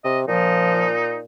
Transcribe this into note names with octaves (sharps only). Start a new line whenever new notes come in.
C3 D#5
A#2 F3 D#4